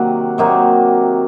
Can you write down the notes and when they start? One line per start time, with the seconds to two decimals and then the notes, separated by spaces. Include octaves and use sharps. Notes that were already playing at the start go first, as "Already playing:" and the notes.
Already playing: C3 D#3 F#3 A#3 F#5
0.38 C3 D#3 F#3 A#3